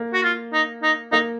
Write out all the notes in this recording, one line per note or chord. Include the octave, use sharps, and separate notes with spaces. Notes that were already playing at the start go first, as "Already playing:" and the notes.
Already playing: A#3
F#4
F4
D#4
D#4
A#3 D#4